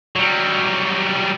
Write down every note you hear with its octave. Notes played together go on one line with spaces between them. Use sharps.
F#3 G3